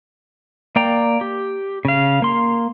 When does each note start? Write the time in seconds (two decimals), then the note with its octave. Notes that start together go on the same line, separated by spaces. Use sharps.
0.76 A#3 D5 G5 A#5
1.21 G4
1.85 C#3 F5
2.22 A#3 C6